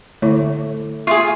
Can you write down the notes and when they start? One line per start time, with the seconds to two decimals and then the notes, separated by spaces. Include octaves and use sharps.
0.22 D3 A3 E4 C#5
1.07 F4 G#4 E5 C#6